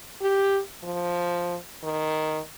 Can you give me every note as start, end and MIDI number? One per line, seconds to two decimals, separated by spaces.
0.21 0.60 67
0.83 1.56 53
1.83 2.39 51